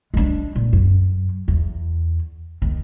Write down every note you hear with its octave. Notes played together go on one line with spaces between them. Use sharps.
G#3 D4
A#2
F#2
E2
D#2